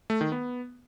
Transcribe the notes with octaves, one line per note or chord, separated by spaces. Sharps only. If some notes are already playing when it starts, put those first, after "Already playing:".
A3
D#3
B3